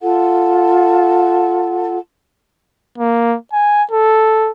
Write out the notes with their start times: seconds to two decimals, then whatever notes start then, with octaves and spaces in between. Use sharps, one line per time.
0.01 F4 A4 F#5
2.98 A#3
3.52 G#5
3.92 A4